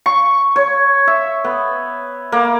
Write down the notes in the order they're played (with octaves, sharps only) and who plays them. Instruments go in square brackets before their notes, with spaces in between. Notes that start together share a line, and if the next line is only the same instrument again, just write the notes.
[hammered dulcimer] C#6
C#5
E5
B3
A#3